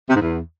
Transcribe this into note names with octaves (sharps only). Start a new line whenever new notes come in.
C3
G#2
E2